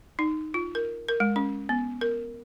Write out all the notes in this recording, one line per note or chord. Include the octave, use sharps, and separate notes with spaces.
D#4
F4
A#4
A#4
G#3
C#4
B3
A#4